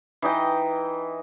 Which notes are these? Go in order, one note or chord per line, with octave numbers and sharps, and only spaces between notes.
E3 D#4 D#5 G5